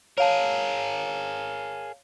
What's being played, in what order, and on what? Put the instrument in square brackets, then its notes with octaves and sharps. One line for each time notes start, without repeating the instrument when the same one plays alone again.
[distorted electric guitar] G#4 A#4 [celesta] C#5 F5 A5